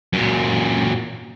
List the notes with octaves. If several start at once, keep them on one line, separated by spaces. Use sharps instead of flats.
F#2 A#2